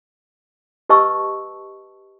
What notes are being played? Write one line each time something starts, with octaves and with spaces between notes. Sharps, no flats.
G4 B4 D#5 A5 C#6 E6